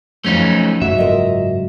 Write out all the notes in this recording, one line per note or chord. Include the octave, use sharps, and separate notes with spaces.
F2 F3 F#3 A3 C#4 D#4
F#1 G#2 F#3 E5
F4 A#4 D#5